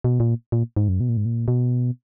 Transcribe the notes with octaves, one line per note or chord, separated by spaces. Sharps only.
B2
A#2
A#2
G#2
F#2
B2
A#2
G#2
A#2
B2